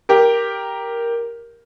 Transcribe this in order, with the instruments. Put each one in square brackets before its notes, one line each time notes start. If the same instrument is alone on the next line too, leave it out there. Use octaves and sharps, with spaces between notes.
[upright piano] G4 A#4